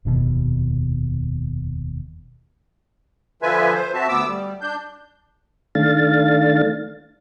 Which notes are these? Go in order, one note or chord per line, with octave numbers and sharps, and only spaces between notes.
F1 D#2 G#2 B2
D3 F3 F4 B4 E5 G#5
C5
C4 F#4 E5 A5
D2 B3 D6 E6
G3
D4 G6
D#3 A3 D4 F5 A6